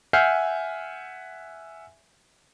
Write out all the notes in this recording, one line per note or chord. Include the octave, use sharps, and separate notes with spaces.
E5 F#5 G#5 F6 G6 C7